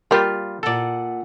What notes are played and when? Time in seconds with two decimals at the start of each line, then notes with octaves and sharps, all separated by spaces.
0.11 G3 A#3 F4 G4
0.63 A#2 A4 D5 F#5